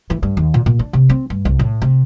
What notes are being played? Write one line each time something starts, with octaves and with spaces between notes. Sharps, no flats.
E3
G2
D#2
A#2
A#2
D4
C3
C4
G2
C2
A2
C3